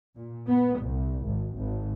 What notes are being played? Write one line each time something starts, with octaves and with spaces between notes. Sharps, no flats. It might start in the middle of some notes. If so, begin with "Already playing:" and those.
A#2
B3
C2
G#1
G#1